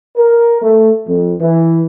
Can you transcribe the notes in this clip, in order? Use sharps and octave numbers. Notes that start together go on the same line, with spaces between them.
A#4
A3
F2
E3